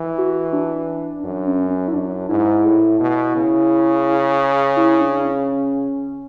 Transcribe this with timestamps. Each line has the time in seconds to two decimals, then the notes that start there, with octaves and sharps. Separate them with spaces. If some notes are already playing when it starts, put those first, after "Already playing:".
Already playing: E3
0.18 F#4
0.53 D4
1.24 F#2 D4
1.47 C#4
1.70 C#4
1.88 E4
1.94 F#2 D4
2.29 G#2 E4
2.65 A2
3.00 B2
3.36 C#3
4.77 E4
5.01 D4
5.25 C#4